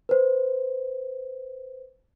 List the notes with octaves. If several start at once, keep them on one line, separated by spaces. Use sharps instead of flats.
B4 C5